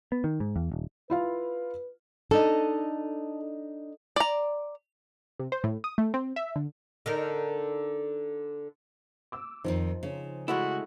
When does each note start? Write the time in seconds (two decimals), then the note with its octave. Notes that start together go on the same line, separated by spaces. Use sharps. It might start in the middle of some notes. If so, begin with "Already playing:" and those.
0.12 B3
0.24 D#3
0.40 G#2
0.56 E2
0.72 D#1
1.10 E4 F4 B4 F5
2.31 D4 D#4 A4 D#5
4.16 D5 A#5
5.40 C3
5.52 C5
5.64 A2
5.84 D#6
5.98 A3
6.14 C4
6.36 E5
6.56 D3
7.06 D3 D#4 A#4
9.32 D6 E6
9.64 F2 G#2 D#3 F3 C4 D#4
10.03 C#3
10.48 G#3 A3 E4 F#4